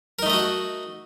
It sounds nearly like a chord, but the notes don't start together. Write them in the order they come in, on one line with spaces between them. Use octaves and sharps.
A#4 D#4 A3 D#5 F#4